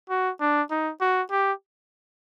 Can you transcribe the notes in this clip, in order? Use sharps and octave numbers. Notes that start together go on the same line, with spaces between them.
F#4
D4
D#4
F#4
G4